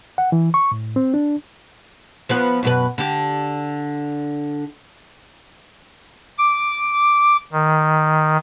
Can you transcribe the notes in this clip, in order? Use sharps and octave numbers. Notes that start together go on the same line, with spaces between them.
F#5
E3
C#6
A2
C4
D4
F3 B3 B4
F#2 B2 B4
D3 G4
D6
D#3